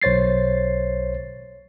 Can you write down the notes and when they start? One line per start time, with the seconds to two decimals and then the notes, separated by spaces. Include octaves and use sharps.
0.02 B1 C5 C#5 A6 C7